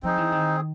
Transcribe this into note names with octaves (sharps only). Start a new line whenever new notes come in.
F3 C4 D#4 G#4
E3
D#3